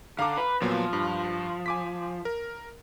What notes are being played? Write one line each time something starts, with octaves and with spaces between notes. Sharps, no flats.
D3 F5 A#5 D6
B4
A#2 F3 F#3 B3
G2
G#5 D6 B6
A#4